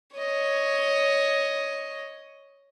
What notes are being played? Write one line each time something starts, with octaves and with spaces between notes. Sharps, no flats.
C#5 D#5